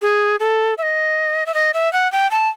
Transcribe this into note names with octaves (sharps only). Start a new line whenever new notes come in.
G#4
A4
E5
D#5
E5
D#5
E5
F#5
G5
A5